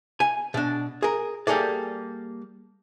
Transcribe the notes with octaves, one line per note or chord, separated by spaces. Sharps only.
G#5
B2 D4
G#4 A#4
G3 A#3 G#4 A4 D5